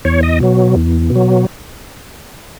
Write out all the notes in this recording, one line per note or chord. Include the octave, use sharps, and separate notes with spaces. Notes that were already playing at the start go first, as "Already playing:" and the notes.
E2 C#5
D#5
B2 F#3
E2
B2
F#3